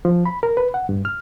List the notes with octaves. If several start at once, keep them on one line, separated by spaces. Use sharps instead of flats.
F3
B5
A#4
B4
F#5
G2
F6